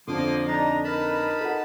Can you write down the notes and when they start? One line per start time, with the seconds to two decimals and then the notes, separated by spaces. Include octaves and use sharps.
0.07 F2 D3 F3 A#3 C6 D6 D#6
0.47 D4 D#4 A#5
0.84 D#4 A#4 B4 A5 B5
1.41 A4 D#5 F#5